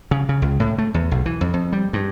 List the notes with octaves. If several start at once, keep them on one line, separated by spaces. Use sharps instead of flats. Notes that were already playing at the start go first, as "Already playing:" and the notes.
C#3
C#3
C#2
A2
A3
E2
B1
E3
F2
F2
G3
G2